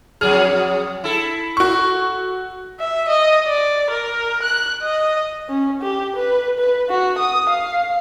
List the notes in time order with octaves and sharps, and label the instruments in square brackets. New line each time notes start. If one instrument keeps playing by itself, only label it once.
[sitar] F2 F#3 G#4 [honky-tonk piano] F6
[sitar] E4 A4
[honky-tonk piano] F#4 C#6
[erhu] E5
D#5
D5
A#4
F#6
D#5
[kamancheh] C#4
G4
B4
B4
F#4
D#6
F5